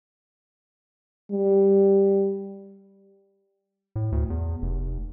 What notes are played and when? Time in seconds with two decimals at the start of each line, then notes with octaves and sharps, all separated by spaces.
1.32 G3
3.96 A2
4.12 D2
4.30 E2
4.62 F1